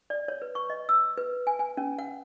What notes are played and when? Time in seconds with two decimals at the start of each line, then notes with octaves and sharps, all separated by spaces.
0.10 D5
0.28 C#5
0.42 B4
0.55 C#6
0.70 D#5
0.89 E6
1.18 B4
1.47 G#5
1.59 G#5
1.77 C#4
1.99 F#5